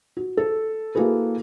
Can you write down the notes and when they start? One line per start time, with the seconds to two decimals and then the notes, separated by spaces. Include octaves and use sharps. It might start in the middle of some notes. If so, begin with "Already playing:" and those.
0.17 F#4
0.37 A4
0.95 A#3 E4 F#4 G#4 A4 B4